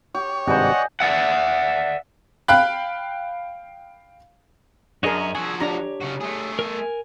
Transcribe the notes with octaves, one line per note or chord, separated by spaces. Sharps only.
G4 C#5
G#1 G2 C3 C5 D5 D#5 F#5 G#5
D5 E5 F#5
F5 G5 B5 F#6
F#2 D4 F#4 G#4 A#4 C#5 D#5
F3 F#4 G#4 G#5 E6
D4 G4 C#5 A#5
C#3 F#4
A3 G#4
A#4 G#5